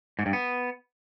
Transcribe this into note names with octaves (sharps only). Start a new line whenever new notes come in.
G#2
G2
B3